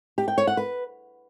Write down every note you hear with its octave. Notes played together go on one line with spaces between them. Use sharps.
G4
G5
C#5
F#5
B4